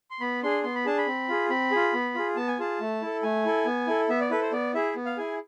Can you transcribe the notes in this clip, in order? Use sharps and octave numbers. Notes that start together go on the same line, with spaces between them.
C6
B3 B5
D4 G#4 C6
B3 C6
B5
D4 G#4 A5
B5
C4
F4 G#4
C4 B5
F4 G#4
B3
F4 G#4
B3 A5
G#5
F4 G#4 A5
A3
E4 A4
A3 G#5
E4 A4
B3
E4 A4
B3 E5
D5
E4 A4 B4
C5
B3 D5
E4 G#4 E5
B3
F5
E4 G#4 G#5